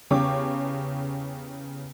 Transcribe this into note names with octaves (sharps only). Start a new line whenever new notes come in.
E2 C#3 G4 C#5 D6